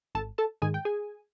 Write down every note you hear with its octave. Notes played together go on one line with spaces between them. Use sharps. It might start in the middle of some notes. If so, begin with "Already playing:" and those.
G#1 A4 A5
A4 A5
G#2 D#3 G#3 G#4 G#5
G5
G#4 G#5